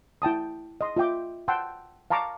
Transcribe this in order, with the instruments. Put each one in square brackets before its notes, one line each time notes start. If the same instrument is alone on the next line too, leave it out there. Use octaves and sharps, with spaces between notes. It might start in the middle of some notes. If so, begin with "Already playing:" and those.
[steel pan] E4 G5 A5 D#6
D#5 C6
F4 E5 G5 D6
F#5 G5 A5 C6 E6
F5 A5 A#5 C#6 D6